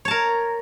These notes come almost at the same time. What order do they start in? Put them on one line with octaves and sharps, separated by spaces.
C#5 A5 A#4